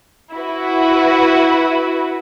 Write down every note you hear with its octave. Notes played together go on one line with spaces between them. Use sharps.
E4 F#4 B4